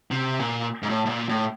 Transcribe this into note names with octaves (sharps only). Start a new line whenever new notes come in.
C3
A#2
G#2
A2
A2
A#2
A2